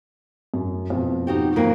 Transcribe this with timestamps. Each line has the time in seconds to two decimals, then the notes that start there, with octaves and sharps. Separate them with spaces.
0.54 F#2
0.90 F2 B2
1.27 D#4 F#4 G4
1.56 F2 A#3